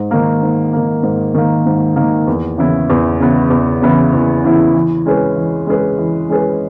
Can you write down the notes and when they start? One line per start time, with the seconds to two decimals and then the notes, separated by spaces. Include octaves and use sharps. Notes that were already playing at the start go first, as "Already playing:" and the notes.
Already playing: G#2
0.11 D#3 A#3
0.42 G#2
0.73 D#3 A#3
1.03 G#2
1.34 D#3 A#3
1.66 G#2
1.96 D#3 A#3
2.27 E2
2.58 C#3 E3 B3 E4
2.90 E2
3.20 C#3 E3 B3 E4
3.50 E2
3.82 C#3 E3 B3 E4
4.13 E2
4.44 C#3 E3 B3 E4
4.74 E3
5.06 G#3 C#4 G#4 B4
5.36 E3
5.67 G#3 C#4 G#4 B4
5.98 E3
6.29 G#3 C#4 G#4 B4